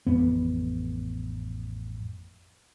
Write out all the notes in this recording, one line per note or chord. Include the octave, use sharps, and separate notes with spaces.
A1 F2 B3